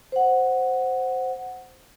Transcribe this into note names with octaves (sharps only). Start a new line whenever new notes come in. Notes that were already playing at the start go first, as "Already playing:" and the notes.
C5 F#5